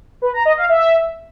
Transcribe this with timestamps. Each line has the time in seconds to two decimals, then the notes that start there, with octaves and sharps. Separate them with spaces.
0.22 B4
0.34 A#5
0.45 D#5
0.57 F5
0.69 E5